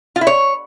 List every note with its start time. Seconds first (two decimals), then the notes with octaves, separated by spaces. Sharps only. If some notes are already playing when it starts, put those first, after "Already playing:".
0.16 F4
0.21 E4
0.27 C#5